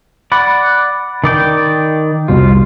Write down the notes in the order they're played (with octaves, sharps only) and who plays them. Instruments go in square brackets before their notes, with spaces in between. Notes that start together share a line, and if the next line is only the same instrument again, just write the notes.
[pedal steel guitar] D5 F#5 [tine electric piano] B5
[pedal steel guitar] D#3 D5 G5
[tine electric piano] C2 F2 B2 [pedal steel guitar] F4